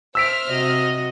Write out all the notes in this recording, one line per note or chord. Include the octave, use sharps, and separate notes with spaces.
C5 E5 E6 F6 B6 D7
C3 F#4 D#5